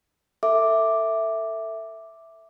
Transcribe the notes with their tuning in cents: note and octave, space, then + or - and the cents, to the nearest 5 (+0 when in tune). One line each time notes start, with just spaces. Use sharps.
A4 +25 E5 +0 D6 +0